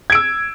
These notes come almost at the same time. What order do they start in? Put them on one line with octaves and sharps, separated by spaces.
G#6 D7 E6